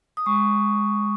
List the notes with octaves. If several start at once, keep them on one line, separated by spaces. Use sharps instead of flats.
D#6
G#3 C#6